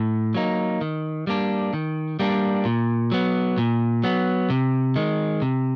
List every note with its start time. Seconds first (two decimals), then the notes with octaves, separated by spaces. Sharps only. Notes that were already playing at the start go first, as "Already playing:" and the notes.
Already playing: A2
0.35 F#3 A#3 D#4
0.81 D#3
1.27 G3 A#3 D4
1.73 D#3
2.20 G3 A#3 D4
2.65 A#2
3.11 F#3 B3
3.58 A#2
4.04 F#3 B3
4.50 C3
4.96 D#3 G#3
5.42 C3